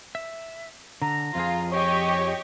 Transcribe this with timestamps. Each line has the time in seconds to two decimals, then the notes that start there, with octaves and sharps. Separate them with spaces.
0.15 E5
1.02 D3 A#5
1.35 F2 F3 F4 G#4
1.72 G4 C#5 D#5 C#6